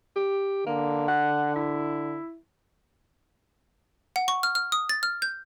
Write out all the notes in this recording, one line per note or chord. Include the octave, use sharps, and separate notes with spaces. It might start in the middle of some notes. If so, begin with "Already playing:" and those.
G4
D3 A#3
F#5
E4
F#5
C#6
F6
F6
D#6
A6
F6
G6